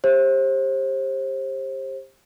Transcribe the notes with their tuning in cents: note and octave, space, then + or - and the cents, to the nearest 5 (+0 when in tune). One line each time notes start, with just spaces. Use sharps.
G4 +20 C5 +30